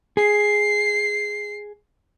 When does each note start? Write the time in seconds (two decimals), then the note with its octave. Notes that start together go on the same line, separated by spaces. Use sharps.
0.17 G#4 C7